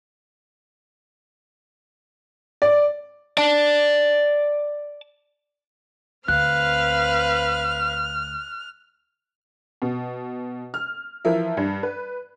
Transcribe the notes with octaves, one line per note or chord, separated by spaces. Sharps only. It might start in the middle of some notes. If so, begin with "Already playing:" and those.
D5
D5 A5
D2 C4 B4 F5 F6 F#6
B2
F6
E3 F3 A#4 E5
G2
B4